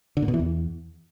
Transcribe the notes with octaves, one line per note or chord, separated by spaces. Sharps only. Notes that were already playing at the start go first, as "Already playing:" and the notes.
D3
A#2
B2
E3
E2